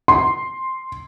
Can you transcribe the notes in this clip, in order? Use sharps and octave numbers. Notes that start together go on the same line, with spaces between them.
C6